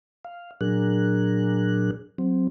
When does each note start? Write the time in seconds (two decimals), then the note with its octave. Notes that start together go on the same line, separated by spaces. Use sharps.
0.25 F5
0.61 A#2 F#3 D4 G#4 A#4 F#6
2.18 F#3 C4